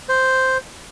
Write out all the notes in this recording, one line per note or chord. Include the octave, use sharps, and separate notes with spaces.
C5